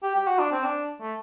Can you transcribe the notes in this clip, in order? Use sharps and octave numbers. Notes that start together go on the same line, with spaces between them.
G4
G4
F#4
D4
C4
D4
A3